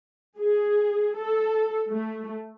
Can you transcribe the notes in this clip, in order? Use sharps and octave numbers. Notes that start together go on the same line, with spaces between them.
G#4
A4
A3